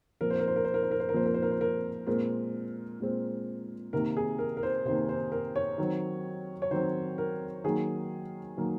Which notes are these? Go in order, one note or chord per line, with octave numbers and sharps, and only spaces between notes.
A#2 F3 C4 A#4
C5
A#4
C5
A#4
C5
A#4
C5
A#4
C5
A#4
A#2 F3 C4 C5
A#4
C5
A#4
C5
A#4
A#2 G#3 C4 A#4
A#2 G#3 C4
C3 D#3 A#3 A#4
G#4
A#4
A#4
C5
C3 D#3 A#3 C5
C5
A#4
C#5
D#3 F#3 C4
C#5
D#3 F#3 C4 C5
A#4
D#3 F#3 A#3 G#4
D#3 F#3 A#3